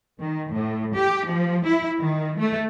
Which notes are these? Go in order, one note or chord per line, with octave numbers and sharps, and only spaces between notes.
D#3
A2
G4
F3
E4
D#3
A3